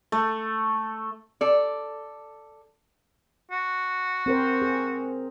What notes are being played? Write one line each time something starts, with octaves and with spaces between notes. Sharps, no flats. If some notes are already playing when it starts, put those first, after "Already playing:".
A3
A4 D5
F#4
C4 A#4 C5
G#4